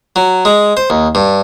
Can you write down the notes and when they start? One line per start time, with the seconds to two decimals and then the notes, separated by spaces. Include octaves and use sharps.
0.16 F#3
0.45 G#3
0.77 C5
0.90 D#2
1.15 G2